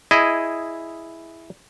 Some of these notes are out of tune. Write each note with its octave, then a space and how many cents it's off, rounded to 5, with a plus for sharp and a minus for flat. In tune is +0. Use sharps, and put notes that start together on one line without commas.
E4 +0 G#4 +0 D#5 +0